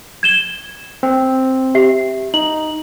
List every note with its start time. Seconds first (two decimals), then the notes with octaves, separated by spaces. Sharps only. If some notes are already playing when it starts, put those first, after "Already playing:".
0.23 G#6 E7 G7
1.03 C4
1.75 G4 E5 C7
2.34 D#4 F#7